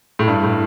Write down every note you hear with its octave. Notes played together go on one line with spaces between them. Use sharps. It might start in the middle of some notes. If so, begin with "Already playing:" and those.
A2
G2
A2